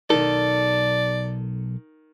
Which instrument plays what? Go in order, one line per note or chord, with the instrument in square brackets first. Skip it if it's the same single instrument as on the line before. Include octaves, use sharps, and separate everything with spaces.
[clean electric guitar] B1 A4 [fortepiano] D#3 [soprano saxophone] D5